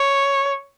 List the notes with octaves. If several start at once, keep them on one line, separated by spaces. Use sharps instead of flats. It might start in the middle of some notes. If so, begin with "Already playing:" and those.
Already playing: C#5